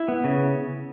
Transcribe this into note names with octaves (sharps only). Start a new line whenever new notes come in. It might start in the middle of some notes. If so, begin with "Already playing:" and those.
Already playing: E4
B3
C#3